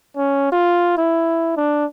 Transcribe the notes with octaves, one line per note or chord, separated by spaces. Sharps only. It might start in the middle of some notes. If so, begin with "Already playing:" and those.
C#4
F4
E4
D4